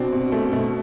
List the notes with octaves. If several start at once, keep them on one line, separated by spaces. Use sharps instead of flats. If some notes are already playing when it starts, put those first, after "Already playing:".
Already playing: B2 F#3 C4 D4
B2
B2 A3
B2 A3